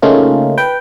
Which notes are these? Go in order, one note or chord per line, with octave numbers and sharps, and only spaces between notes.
C#3 A3 A#3 C#4 D#4 F4
B4 G5